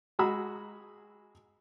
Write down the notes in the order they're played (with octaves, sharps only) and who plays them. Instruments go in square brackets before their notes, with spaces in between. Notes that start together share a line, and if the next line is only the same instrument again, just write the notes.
[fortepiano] G#3 F#4 G#4 A#5 B5 E6